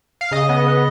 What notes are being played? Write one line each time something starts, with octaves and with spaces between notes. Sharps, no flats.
F5
C#3 D#5
B3
B3